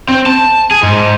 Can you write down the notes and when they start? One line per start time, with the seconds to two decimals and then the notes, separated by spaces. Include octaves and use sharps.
0.09 C4
0.26 A5
0.71 G#4
0.83 G#2